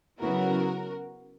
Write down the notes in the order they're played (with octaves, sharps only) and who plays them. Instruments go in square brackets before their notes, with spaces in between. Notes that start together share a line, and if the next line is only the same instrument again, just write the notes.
[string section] C#3 F#3 B3 E4 F#4 A#4